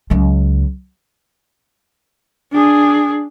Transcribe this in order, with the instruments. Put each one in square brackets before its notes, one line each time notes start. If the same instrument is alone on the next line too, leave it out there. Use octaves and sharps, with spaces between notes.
[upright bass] C#2 F#3
[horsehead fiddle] D4 G#4